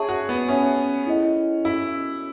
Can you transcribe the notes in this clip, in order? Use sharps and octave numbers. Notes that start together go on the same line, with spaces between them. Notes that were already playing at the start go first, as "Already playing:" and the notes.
Already playing: G#4 C#5 E5 A5 C#6
F#4
B3
C#4 C#5 E5 G#5 B5
E4 A4 D#5 F#5
E4 F#4 A4 E5